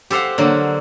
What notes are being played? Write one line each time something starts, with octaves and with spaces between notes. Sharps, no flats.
G4 A4 C5 F5 F#5
D3 F#3 A#3